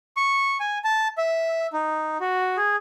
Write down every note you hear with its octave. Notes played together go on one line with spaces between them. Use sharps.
C#6
G#5
A5
E5
D#4
F#4
G#4